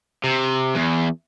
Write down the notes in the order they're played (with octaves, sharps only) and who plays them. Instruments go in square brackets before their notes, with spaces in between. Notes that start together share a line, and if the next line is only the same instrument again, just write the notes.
[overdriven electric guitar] C3
E2